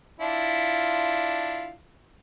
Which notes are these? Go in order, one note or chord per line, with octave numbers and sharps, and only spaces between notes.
D4 E4 F4